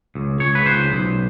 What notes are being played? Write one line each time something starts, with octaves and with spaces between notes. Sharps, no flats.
C#2
C#2 C#5
B4
C#2 C5
B1